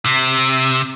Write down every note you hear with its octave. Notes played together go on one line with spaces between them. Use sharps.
C3